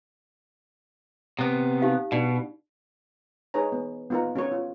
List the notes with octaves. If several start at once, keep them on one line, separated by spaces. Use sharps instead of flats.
C3 B3
D#4 G4 F5
B2 D4 D#4 D5
D#4 G#4 B4 C#5 A#5
B3
B3 D#4 F4 A#4 F#5 A#5
C#4 F#4 A#4 C#5
F4